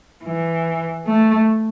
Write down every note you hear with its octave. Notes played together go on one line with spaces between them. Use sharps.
E3
A3